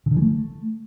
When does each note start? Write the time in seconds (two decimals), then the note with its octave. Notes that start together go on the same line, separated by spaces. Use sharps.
0.06 C#3
0.11 D3
0.17 E3
0.22 A3